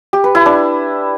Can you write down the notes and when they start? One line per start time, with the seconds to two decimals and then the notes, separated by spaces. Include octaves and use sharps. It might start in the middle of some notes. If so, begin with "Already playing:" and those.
0.13 G4
0.24 B4
0.35 E4
0.46 D4